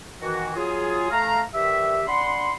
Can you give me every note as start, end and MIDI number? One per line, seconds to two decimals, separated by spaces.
0.21 0.51 51
0.21 0.51 52
0.21 0.51 66
0.56 1.08 54
0.56 1.08 65
0.56 1.08 68
1.11 1.41 57
1.11 1.41 77
1.11 1.41 82
1.54 2.02 43
1.54 2.02 51
1.54 2.02 67
1.54 2.02 76
2.07 2.52 62
2.07 2.52 78
2.07 2.52 83
2.07 2.52 84